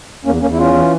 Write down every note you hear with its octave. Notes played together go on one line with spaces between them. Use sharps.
E2 A#3 C#4
E2 A#3 C#4
E4
E3 C#4 F4
E3